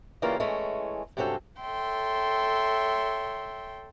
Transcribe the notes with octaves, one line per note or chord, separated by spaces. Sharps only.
C#3 E3 G3 A#3 C#4 F4
E3 G#3 A3 C#4
G2 C3 F#3 C#4 A4 G5
A4 C#5 E5 G5 C6